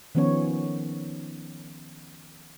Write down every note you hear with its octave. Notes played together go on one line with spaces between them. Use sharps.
D#3 F3 B3 C#4 C#5